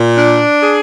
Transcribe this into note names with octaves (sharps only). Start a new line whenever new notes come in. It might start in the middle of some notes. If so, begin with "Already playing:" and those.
Already playing: A#2
D4
G#4